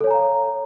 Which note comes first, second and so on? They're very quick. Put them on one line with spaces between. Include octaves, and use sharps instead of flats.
A4 C#5 G#5 A#5 F5